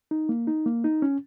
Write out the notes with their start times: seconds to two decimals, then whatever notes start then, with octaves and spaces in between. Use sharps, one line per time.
0.11 D#4
0.29 A#3
0.47 D#4
0.66 A#3
0.84 D#4
1.02 C#4